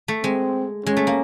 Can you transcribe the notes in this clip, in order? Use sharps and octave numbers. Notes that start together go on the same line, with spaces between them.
A3
G#3 C4
G#3 C#4
A3
A#3